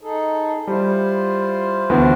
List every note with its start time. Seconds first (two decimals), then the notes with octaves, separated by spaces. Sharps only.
0.01 D#4 G#4 A4
0.67 G3 E4 F4 C5
1.90 D2 E3 B3